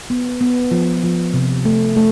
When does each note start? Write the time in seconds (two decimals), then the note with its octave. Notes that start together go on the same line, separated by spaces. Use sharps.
0.10 B3
0.41 B3
0.71 F3
1.03 F3
1.34 C3
1.65 A3
1.96 A3